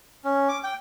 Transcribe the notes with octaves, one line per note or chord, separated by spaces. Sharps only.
C#4
D6
G5